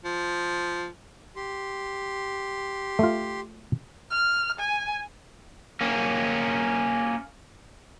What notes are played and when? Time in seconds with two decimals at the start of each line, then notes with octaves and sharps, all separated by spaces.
0.05 F3
1.36 G4 C6
2.99 A3 F4
4.11 F6
4.60 G#5
5.81 A#3 C#4